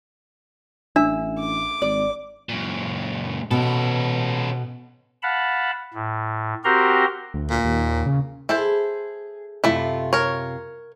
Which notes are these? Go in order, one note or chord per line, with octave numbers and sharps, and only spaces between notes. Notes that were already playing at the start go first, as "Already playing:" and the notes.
A1 D4 E5
D6
G#1 D5
F#2 A#2
B2 C#4 A4
F5 F#5 A5 B5
A2
C4 F#4 G4 A#4 A#5 C6
D2
A#2
D#2
C#3
E4 G#4 A4 C5
F#2 C3 A3 E4 F4
A#4 C#5